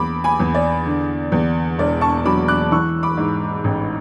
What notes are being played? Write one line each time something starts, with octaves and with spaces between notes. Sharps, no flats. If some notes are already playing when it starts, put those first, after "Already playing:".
Already playing: E2 B5 D6
G#5 B5
E2
D5
D3
E2
E1 D5
A5 C#6
F#3 B5 D6
D6 F#6
E3 C#6 E6
B5 D6
G#2
A1